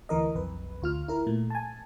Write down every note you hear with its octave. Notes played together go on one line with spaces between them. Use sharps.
D2 E3 A#4 D#5
B1 F2 B4
D2 F4 F6
E4 A#4
A#2 A3
G#5 A5